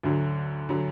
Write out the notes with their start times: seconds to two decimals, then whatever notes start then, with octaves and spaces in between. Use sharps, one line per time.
0.03 D2 D3 F#3
0.69 D3 F#3